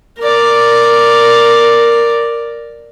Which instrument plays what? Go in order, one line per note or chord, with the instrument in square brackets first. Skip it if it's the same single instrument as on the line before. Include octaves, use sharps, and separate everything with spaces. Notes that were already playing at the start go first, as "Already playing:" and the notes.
[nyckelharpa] A#4 D5